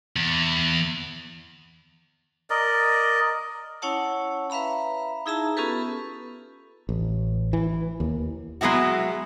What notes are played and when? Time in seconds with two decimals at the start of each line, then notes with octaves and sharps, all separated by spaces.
0.16 E2
2.50 A#4 D5 D#5
3.82 C#4 E4 C#5 F#5 A5
4.50 B4 E5 F5 A#5 B5
5.26 D#4 E4 G#4 E5 A5 A#5
5.57 B3 C#4 F4 G4 A4 B4
6.89 A1
7.53 E3
8.00 D#2
8.61 F#3 G#3 B3 E4 F#4